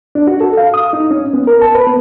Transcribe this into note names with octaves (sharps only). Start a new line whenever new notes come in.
D4
F#4
A4
F5
D#6
D#4
C#4
B3
A#4
A5
B4
B3